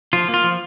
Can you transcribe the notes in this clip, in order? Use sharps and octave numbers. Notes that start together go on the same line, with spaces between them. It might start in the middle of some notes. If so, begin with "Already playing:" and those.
F3 F4
A#3
F4
F3